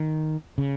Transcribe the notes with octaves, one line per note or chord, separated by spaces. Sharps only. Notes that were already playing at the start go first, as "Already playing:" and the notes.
Already playing: D#3
C#3